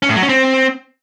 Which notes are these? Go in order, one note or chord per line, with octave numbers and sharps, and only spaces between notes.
C#4
A2
F#3
C#4
C4